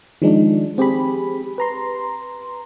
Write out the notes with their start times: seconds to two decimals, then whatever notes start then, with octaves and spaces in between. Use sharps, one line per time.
0.22 D#3 F3 G#3 D4 D#4
0.78 C4 G4 G#4 B5
1.58 B4 A#5 C6